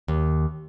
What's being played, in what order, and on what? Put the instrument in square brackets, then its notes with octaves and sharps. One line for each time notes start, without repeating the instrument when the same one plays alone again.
[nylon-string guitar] D#2